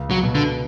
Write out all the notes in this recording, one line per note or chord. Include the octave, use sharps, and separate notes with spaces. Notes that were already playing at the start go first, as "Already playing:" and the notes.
Already playing: C#2
F#3
B2
D3